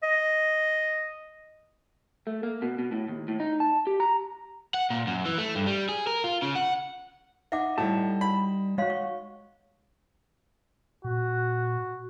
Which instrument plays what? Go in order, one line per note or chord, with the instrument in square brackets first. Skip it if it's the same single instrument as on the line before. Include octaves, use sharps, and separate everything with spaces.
[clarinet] D#5
[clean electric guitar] A3
A#3
B2
B2
A2
D#2
A2
D#4
A5
G4
A#5
[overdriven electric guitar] F#5
A#2
F#2
E3
A3
G2
G3
G#4
A#4
F4
C#3
F#5
[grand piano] D#4 [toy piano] E5 F#5 D6
[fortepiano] A2 [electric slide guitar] G3 A5
[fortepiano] B5
[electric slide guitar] G#3 F#4 [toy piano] C#5 F5 C6
[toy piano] C#6
[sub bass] A#2 [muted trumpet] F#4